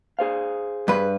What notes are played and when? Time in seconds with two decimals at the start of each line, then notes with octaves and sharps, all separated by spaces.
0.19 G#4 C5 F5
0.88 G2 B4